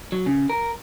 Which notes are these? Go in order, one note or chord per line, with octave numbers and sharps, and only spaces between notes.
F#3
C#3
A#4